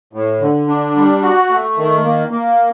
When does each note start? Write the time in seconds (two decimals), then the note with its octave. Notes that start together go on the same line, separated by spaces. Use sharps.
0.13 A2
0.41 D3
0.68 D4
0.96 G3
1.23 F#4
1.50 A3
1.77 D#3
2.04 A#3
2.31 A#3